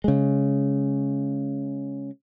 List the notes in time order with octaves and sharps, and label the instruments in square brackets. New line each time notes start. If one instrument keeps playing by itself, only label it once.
[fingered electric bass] C#3 G#3